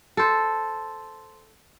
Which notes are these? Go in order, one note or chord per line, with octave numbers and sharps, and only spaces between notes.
A4 C5